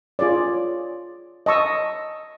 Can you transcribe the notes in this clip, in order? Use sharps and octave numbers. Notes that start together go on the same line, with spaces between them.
F4 G#4 C#5 D5
D#5 A5 C#6 E6